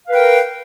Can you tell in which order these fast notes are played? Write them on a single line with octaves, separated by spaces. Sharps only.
F5 B4 G5 A#4